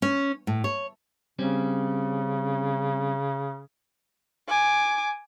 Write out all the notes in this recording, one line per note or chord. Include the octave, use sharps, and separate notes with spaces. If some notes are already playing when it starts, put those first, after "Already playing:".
C#4
A2
C#5
C#3 G3 C4 C#4
G#5 D6